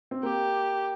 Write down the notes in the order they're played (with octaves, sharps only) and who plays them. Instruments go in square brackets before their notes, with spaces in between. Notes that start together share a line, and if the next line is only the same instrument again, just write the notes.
[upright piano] C4
[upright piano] A#3 [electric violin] G4